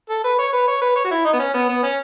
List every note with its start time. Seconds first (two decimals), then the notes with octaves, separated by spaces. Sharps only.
0.10 A4
0.24 B4
0.39 C#5
0.53 B4
0.68 C#5
0.81 B4
0.96 C#5
1.05 F#4
1.11 E4
1.25 D#4
1.33 B3
1.40 C#4
1.54 B3
1.69 B3
1.83 C#4